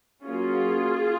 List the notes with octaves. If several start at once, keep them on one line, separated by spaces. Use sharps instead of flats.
F#3 A#3 C#4 F4 G#4